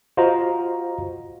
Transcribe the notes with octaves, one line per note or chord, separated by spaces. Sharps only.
F4 F#4 C5 D#5 F5 A#5